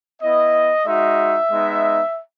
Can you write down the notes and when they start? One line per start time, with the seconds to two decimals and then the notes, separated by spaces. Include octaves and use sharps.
0.22 B3 E4 D#5
0.86 G#3 D#4 F#4 E5
1.51 G#3 B3 D#4